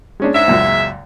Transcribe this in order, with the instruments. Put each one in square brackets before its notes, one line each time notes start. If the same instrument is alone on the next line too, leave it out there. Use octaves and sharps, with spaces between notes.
[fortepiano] G#3 C#4 D4
[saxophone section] G#2 E5
[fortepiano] C#2 F#2 A#2